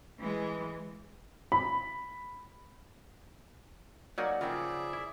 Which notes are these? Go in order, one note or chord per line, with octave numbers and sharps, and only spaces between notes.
E3 G#3
B5
F#3 A#3 D#4 F#4 D5 F#5 G#5
C#3 F3 F4 G#4 A#4 D5 E5 G5
E4